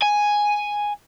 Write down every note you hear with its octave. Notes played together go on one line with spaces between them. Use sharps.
G#5